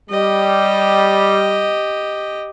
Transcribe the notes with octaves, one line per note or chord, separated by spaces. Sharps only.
G3 G4 D#5